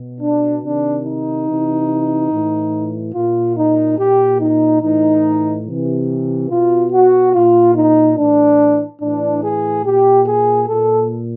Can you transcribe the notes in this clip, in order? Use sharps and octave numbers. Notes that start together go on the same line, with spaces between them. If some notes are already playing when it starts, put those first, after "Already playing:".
Already playing: B2
D4
C3 D#3 D4
D#4
C3 E3
A2 E3
A#2 F4
D#4
A#2 G4
D#4
A2 E3 D#4
C3 E3
B2 F4
F#4
A#2 F4
D#4
A2 E3 D4
A2 E3 D4
G#4
A#2 G4
G#4
A#2 A4